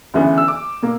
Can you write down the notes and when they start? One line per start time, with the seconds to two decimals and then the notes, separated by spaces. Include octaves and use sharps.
0.14 D2 C#3 E3 B3
0.38 E6
0.48 D6
0.83 B2 A#3